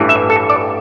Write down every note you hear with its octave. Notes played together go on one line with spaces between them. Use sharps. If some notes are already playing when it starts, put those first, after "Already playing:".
Already playing: A1 G2 E3
E5
A4
D5